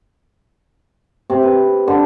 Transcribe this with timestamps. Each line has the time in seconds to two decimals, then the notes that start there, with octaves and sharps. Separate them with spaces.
1.30 C3
1.43 B4
1.87 D3